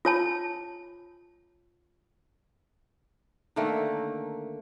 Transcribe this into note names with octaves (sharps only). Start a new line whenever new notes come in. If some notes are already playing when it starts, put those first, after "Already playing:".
F4 C#5 A5
D3 D#3 A3 A#3